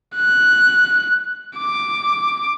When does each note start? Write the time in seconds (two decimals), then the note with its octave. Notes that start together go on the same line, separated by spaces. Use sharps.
0.16 F#6
1.57 D6